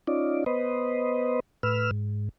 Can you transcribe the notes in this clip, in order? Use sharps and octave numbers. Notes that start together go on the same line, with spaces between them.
C#4 D#4 F4 D5
B3 B4 C5 D#5
A2 B4 E6 F6
G#2